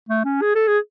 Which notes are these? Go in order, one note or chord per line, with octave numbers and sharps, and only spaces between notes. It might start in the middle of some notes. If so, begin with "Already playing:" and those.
A3
C#4
G#4
A4
G#4